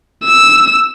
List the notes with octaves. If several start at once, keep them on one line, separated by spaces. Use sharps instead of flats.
E6